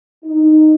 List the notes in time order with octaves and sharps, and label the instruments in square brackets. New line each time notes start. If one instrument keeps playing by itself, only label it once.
[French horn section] D#4